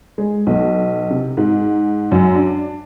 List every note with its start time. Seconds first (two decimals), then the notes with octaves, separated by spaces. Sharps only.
0.18 G#3
0.47 B1
1.10 C3
1.37 G#2
2.12 F#2
2.35 D4